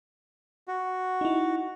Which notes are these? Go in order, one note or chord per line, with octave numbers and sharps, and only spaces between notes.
F#4
D#4 E4